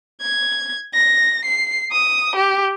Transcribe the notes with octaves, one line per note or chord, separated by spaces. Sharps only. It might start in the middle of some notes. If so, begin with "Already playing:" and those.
G#6
A#6
C7
D#6
G4